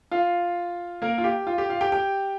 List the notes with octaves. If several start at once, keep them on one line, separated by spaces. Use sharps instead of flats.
F4 F5
A#3 A#4
F4
G4
F4
G4
F4 F5
G4 G5
G4 G5